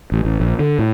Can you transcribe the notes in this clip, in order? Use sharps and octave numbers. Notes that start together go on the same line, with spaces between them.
A1
A1
A#1
D3
A2